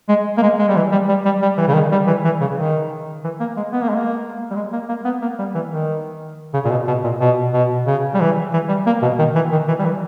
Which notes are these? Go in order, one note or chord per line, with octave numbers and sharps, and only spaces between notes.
G#3
A#3
G#3
G#3
G3
E3
G3
G3
G3
G3
E3
C#3
D#3
G3
E3
E3
C#3
D#3
E3
A#3
G#3
B3
A#3
G#3
A#3
G3
G#3
A#3
A#3
B3
A#3
G3
E3
D#3
C#3
A#2
B2
B2
A#2
B2
B2
C#3
G3
E3
E3
G3
A#3
B2
D#3
E3
D#3
E3
G3
E3